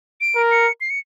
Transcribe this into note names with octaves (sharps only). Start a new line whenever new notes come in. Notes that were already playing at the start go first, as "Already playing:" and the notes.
D7
A#4
C#7
C7
C#7